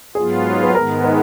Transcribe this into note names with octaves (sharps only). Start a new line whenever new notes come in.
G#2 F#3 B3 F4 G#4
B4
G#2 D#3 G#3 B3 A#4
A#4